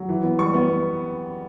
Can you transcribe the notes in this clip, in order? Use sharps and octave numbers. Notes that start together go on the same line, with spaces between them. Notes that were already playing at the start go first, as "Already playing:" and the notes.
Already playing: F#3
E3
B3
G3 C#6
B3